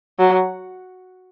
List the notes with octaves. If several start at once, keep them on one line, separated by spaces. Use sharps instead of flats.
F#3